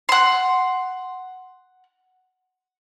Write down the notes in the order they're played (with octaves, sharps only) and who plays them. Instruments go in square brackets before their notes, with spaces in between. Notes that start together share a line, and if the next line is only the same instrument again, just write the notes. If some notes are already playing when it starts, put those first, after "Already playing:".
[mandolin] F#5 C6